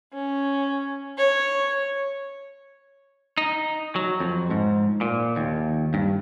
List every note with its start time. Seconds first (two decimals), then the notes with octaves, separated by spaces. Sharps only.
0.13 C#4
1.17 C#5
3.38 D#4
3.96 F#3
4.20 F2
4.50 G#2
5.01 A#2
5.36 D#2
5.94 G2